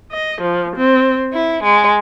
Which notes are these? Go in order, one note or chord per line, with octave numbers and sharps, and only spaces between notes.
D#5
F3
C4
E4
G#3